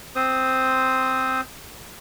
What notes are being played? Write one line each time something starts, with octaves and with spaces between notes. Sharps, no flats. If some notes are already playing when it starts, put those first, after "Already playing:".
C4 C5 D#6